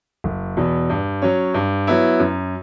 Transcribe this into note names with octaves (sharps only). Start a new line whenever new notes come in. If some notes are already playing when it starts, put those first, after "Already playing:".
F#1
E2 B2
G2
F#3 C#4
G2
F#3 B3 E4
F#2